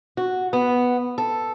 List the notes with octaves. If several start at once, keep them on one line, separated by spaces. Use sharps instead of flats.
F#4
B3
A4